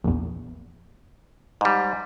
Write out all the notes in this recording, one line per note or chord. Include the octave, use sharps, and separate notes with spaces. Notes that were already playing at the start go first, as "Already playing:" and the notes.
A#1 E2
G#2 G3